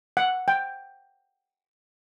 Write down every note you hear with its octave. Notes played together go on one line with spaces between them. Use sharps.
F#5
G5